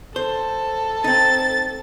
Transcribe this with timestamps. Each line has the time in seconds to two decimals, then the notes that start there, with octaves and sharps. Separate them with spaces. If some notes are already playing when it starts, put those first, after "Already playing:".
0.16 A4 C5
1.04 C4 D#4 A6